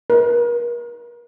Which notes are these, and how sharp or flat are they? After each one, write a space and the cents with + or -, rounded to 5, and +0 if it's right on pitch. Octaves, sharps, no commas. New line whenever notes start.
A#4 +40